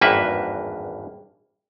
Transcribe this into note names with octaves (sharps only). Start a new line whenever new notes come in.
G#1 E2 G2 A#3 B4 E5